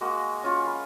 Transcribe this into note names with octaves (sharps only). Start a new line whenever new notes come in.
G#3 A#3 F#4
C#4 F4 C#5
F5 B5